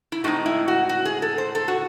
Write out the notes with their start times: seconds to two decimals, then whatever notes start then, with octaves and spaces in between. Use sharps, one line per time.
0.12 E4
0.24 A2 G#3 C4 D#4 F#4
0.46 E4
0.68 F#4
0.89 F#4
1.05 G#4
1.22 A4
1.38 C5
1.55 A4
1.68 F#4